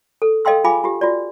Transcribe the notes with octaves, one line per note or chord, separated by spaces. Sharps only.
A4
A4 D#5 F5 G5 C6 E6
F4 G#4 F5 G#5 B5 D6
F4 G4
F4 F#4 D5